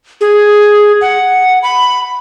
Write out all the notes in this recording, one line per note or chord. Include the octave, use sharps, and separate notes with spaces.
G#4
F#5
B5